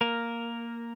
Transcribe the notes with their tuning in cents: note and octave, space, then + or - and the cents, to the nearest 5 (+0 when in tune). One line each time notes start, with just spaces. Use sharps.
A#3 +0 A#4 +0